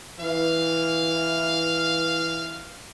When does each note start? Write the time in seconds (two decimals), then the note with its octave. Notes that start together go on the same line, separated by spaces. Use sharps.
0.19 E3 F5